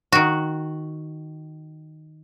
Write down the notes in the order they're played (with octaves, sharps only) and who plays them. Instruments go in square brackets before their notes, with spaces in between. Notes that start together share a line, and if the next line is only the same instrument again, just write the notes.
[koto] D#3 F#4